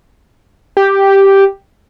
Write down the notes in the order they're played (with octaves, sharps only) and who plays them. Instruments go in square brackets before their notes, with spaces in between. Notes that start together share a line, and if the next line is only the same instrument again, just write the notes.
[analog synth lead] G4